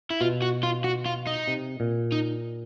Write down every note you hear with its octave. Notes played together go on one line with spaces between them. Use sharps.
E4
B2 F4
F#4
F4
F#4
F4
D#4
C3
A#2
D#4